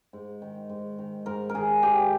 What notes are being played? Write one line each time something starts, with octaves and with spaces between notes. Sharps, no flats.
G#2
D#3
G#2
D#3
G#2 A#4
A#4
D#3 G#4
G#2 G4